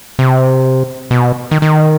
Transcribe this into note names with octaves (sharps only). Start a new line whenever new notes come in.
C3
B2
D#3
D#3